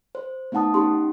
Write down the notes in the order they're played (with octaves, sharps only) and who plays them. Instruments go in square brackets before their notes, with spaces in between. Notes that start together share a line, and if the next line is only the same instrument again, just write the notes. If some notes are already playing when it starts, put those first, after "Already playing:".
[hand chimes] C5
A3 B3 D#4 F#5 A5 D#6
C#4 D#4 G4 C6